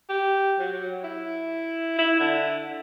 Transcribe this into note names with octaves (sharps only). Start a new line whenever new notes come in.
G4
F#3
E4
E4
D3